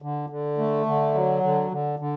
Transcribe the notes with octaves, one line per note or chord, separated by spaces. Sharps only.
D3
D3
A3
D3
F#3
D3
D3
D3